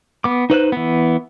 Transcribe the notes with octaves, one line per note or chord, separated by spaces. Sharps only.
B3 D6
D#4 B4 C5 F#6
E3 B3